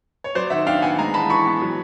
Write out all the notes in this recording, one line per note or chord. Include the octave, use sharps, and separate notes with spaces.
C#5
F#3 C5 D5
D#3 E5 F#5
D4 F5 G5
B3 F#5 G#5
G#3 G#5 A#5
E3 A5 B5
E3 B5 C#6
B3
F#3